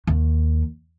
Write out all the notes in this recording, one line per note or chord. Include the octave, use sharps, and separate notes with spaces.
D#2